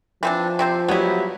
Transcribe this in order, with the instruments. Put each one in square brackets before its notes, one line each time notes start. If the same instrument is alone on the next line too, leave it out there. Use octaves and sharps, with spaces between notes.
[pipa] E3 C4 D4 [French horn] F3
[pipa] C3 C4 C5
[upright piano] F#3 G3 C#5 [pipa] B3 E4